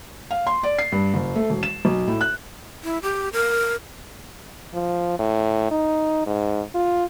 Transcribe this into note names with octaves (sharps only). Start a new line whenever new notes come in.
F5
C6
D5
C7
G2
F#1
A3
E1
E7
B1
A2
F#6
E4
G4
A#4
F3
A2
D#4
G#2
F4